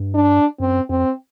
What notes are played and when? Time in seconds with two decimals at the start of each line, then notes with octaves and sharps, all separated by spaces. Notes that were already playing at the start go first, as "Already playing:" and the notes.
Already playing: G2
0.15 D4
0.60 F#2 C4
0.89 F2 C4